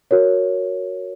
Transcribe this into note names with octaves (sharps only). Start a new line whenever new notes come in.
F#4 A#4 C#5